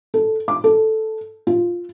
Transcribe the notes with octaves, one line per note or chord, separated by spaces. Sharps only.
A4
D6
A4
F4